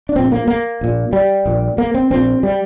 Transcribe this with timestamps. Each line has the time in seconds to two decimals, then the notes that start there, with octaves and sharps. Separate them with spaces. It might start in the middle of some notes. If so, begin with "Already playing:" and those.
0.09 D4
0.15 A#1 A#2 C4
0.32 A#3
0.48 A#3
0.81 A#1 A#2
1.13 G3
1.46 A#1 A#2
1.78 A#3
1.94 C4
2.10 A#1 A#2 C4
2.43 G3